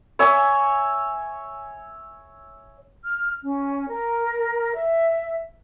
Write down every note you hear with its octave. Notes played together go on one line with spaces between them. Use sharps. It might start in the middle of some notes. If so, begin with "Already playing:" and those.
C#5 E5 G#5
F6
C#4
A#4
E5